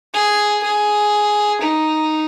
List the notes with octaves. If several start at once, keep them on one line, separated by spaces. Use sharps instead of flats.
G#4
G#4
D#4